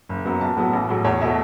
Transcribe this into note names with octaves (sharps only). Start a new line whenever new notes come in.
F#1
F#2 F#3 B3
B1 A5
A2 F#3 B3
A1
A2 F#3
E2 C#5
B2 A3 E5